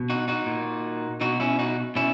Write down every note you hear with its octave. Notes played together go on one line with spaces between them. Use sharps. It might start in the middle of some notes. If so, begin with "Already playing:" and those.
Already playing: B2
D#4 F#4
D#4 F#4
A#2
B2 D#4 F#4
C#4 E4
D#4 F#4
B2 C#4 E4